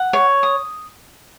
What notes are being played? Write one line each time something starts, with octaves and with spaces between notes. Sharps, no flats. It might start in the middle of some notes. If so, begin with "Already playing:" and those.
Already playing: F#5
C#5
D#6